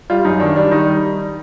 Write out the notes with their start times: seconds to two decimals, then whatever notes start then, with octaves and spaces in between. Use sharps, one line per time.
0.10 G3 F4
0.25 F#2 D#4
0.40 D#3 D4
0.56 G3 D4
0.71 D#3 D#4
0.88 G3